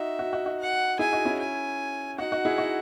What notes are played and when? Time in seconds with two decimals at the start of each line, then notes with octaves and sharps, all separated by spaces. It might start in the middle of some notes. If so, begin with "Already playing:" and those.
Already playing: D#4 F#4 E5
0.19 D#4 F#4
0.33 D#4 F#4
0.46 D#4 F#4
0.59 F#5
0.99 E4 G#4 G#5
1.13 D#4 F#4
1.25 C#4 E4
1.39 G#5
2.18 D#4 F#4 F#5
2.32 D#4 F#4
2.45 E4 G#4
2.58 D#4 F#4